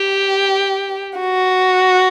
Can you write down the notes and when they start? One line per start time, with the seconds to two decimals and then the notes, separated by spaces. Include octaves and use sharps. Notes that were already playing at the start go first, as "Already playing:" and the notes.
Already playing: G4
1.19 F#4